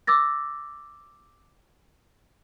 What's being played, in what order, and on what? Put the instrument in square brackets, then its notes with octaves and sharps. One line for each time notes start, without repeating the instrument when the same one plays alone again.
[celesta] D6 E6 A6 A#6